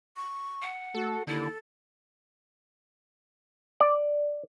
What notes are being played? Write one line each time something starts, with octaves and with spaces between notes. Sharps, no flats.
C#6
F#5
A3 F#4 A4
D#2 D3 E4 A4
D5